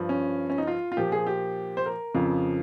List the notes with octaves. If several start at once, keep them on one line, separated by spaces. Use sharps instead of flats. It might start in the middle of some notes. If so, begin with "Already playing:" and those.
Already playing: G2 F3
C#4
C#4
D#4
F4
F4
A#2 F3 G4
G#4
G4
C5
A#4
F2 C#3 F3